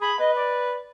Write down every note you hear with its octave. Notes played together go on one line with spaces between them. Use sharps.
G#4 B5
B4 D#5
D5